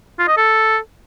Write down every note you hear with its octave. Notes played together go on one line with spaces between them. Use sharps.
F4
D#5
A4